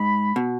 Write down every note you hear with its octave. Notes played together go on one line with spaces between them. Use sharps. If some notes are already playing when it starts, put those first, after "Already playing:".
Already playing: G#2 B5
B2